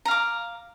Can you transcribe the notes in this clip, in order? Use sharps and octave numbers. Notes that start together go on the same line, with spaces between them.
F5 A#5 D6